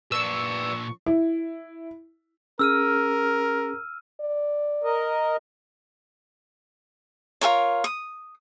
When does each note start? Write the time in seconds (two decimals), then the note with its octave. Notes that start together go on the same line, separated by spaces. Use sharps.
0.12 A#2 D4 B4 D5 C#6 E6
1.06 E4
2.59 C#4 G#4 A#4 E6 F6 D#7
4.21 D5
4.84 A#4 D#5
7.41 F4 A4 A#4 C#5
7.84 D#6